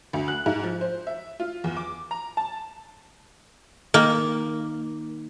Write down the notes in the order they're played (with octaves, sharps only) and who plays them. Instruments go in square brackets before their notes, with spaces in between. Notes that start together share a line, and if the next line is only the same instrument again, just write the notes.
[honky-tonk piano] D2
F#6
G#2
F3
C5
E5
F4
E2
D6
A#5
A5
[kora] D#3 [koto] A#3